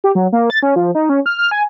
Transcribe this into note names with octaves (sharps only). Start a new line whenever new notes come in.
G4
F#3
A#3
A6
C#4
F3
D#4
C#4
F6
F6
G#5